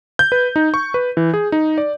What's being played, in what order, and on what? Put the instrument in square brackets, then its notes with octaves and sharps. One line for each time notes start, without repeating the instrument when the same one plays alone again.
[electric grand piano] G6
B4
D#4
C#6
B4
E3
G#4
D#4
D5